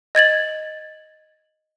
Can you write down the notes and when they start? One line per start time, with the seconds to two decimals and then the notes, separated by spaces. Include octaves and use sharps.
0.15 D#5 G#6 A6 F#7